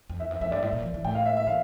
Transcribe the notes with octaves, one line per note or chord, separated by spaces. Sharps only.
F2
E2 E5
F2 E5
F2 E5
G2 D5
A2 E5
A#2
F3
E3
A2 G5
F5
E5
E5
E3 F5